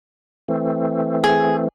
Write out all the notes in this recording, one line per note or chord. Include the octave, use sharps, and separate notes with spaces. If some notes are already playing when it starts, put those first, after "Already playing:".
E3 A3 C4
G#4